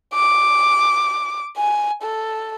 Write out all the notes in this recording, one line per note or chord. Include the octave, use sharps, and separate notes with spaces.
D6
G#5
A4